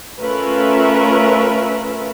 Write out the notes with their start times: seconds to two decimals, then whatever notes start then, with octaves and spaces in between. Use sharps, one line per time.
0.19 A3 C#4 F4 A#4 B4 E5